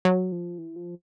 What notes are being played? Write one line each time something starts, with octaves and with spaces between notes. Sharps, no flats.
F#3
F3
E3
F3